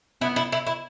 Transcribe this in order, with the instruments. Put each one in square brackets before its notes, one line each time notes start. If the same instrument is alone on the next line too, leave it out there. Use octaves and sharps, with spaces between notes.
[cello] B3 [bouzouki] E4
[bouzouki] E4
E4
E4